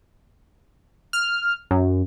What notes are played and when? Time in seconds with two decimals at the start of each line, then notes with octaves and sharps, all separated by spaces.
1.13 F6
1.71 F#2